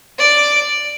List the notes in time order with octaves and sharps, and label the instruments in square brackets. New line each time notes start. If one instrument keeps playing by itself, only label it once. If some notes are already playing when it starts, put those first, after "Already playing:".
[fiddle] D5